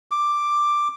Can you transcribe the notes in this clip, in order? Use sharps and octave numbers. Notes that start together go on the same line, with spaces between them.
D6